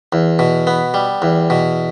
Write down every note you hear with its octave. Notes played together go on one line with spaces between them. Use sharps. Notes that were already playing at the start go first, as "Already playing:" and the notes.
E2
B2
B3
G3
E2
B2